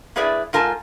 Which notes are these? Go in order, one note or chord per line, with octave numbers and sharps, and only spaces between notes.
A#3 E4 G#4 B4 D5 E5
G#2 F4 A#4 G#5 A5